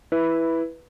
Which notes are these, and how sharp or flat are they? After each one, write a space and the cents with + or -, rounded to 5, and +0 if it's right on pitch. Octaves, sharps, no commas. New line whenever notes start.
E4 +0 B4 -5